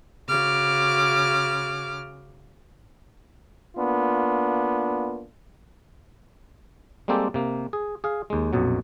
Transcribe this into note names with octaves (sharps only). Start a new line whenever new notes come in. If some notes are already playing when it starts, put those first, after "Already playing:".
C#3 F#4 D6 F6
A#3 B3 D4 F4
G3 G#3 A#3 C4 G4 A4
C3 A#3
G#4
G#4 F5
D#2 G#3
A#1 F2 B2 F#3